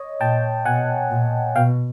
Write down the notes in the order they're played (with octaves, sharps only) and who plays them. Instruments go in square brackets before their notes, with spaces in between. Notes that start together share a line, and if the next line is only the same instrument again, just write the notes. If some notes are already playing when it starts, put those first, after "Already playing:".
Already playing: [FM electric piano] C#5 D#5
[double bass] A#2 [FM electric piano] G5 A5
[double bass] B2 [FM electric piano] F#5 G#5
[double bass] A#2
[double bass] B2 [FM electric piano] F5 G5